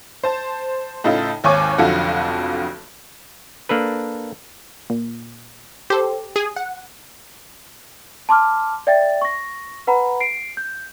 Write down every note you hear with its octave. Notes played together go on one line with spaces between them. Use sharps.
C5 A5
A2 C#3 D#4 F4 A4
G#1 D#2 C#5 G#5 C#6 D6
F1 B1 F2 D3 F4 F#4
A#3 D4 A4 B4
A#2
G4 A4 C5
G#4 G#5 D#6
F#5
A5 C6 D6 F6
D5 E5 G5 A6
C#6 A#6
B4 F#5 A#5 B5
C7 D7
G6